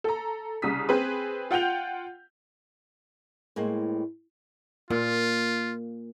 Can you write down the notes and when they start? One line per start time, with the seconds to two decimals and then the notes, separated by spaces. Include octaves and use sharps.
0.04 A4 A#5
0.62 C2 C#3 D#6 B6
0.89 C4 G#4 B4
1.51 F4 F#5 G5 G6 F7
3.56 A2 G#3 A#3 C4
4.90 A#2 A#3 F4